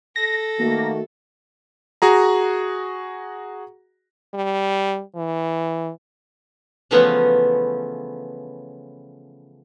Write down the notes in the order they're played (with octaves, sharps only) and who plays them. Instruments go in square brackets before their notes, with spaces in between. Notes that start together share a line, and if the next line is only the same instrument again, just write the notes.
[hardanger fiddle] A4 [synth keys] A#6
[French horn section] D#3 A3 F#4 [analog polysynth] A#3
[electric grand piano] F#4 G#4 A#5
[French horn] G3
E3
[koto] C#3 E3 F3 A3 B3 C#4